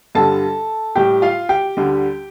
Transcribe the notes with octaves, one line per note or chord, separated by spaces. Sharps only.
G2 D3 G3 A4 A5
A2 G3 G4 G5
F4 F5
G4 G5
D2 D3 G3